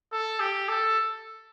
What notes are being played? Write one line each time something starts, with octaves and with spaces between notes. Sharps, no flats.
A4
G4
A4